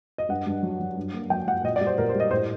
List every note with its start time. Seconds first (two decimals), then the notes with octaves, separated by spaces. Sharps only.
0.18 D#5
0.29 G2 F#5
0.47 G2
0.63 F#3
0.80 F#3
0.97 G2
1.14 A#3
1.30 F#3 G5
1.47 F#3 F#5
1.64 A#2 D#5
1.76 D5
1.81 G3
1.87 C5
1.98 A#2 A#4
2.09 C5
2.15 G3
2.20 D#5
2.31 A2 C5